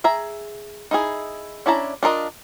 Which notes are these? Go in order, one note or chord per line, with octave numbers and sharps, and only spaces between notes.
G#4 E5 A#5
D#4 E4 G#4
C#4 D4 E4 A5 A#5
D4 F4 A#4 D#5